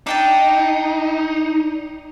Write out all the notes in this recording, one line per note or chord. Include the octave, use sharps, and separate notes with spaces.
D4 D#4 G5 A5